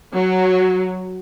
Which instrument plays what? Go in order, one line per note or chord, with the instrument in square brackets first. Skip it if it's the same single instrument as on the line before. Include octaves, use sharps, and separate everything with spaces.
[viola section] F#3